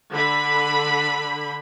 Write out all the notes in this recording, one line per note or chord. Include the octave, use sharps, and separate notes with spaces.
D3 B5